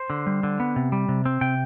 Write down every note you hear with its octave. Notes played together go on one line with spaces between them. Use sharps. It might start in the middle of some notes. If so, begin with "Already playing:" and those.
Already playing: C5
D3
G3
D3
B3
C3
G3
C3
C4
C3 G5